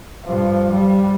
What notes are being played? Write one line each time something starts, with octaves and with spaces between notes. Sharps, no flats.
G2 F3
G3